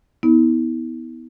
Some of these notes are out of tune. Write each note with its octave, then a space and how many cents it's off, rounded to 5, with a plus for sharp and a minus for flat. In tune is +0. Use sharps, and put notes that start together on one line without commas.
B3 +0 E4 -45